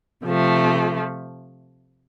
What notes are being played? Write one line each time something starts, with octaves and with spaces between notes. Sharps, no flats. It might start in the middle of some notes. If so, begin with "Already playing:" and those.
C3 F3 A3